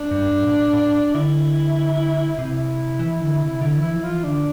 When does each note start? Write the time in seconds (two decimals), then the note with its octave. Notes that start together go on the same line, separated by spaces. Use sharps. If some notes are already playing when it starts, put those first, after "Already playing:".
Already playing: D4
0.11 G2
0.31 G2
0.44 A#2
0.52 A2
0.73 A2
1.14 D3 E4
2.38 C3 E4
2.99 E3
3.21 D3
3.42 C3
3.61 D3 E4
3.78 E3 E4
3.93 F3
4.03 F4
4.09 E3
4.24 D3 D4